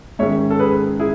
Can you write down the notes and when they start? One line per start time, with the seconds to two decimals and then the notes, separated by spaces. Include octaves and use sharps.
0.19 G#2 D#3 G#3 C#4 C#5 E5
0.50 A4
0.59 G#4 B4
0.99 E4 G#4